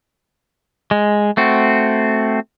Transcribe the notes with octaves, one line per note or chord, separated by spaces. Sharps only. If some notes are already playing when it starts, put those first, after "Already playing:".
G#3
A3 C4 F#4